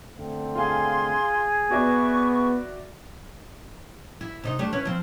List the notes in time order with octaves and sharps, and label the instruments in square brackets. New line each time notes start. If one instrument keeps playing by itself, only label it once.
[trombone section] D3 A3 C4
[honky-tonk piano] F4 G#5 [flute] G#4 [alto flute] C6
[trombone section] B3 [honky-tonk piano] F#4 D5 E5 [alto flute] C#6
[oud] E4
C3 D#4 D#5
G3 A3 D4
C#4 E4 B4
F3 C4